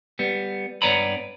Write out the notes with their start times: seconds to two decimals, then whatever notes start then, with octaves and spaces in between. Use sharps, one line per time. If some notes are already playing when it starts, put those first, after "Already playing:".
0.19 G3 B3
0.82 G2 B3 C#5 D5 A#5 B5